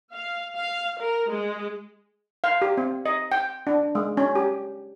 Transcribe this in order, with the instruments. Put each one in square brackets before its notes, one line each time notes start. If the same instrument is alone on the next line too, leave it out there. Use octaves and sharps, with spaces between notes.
[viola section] F5
F5
A#4
G#3
[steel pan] F5
G4
C4
D#5
G5
D4
G#3
C#4
G4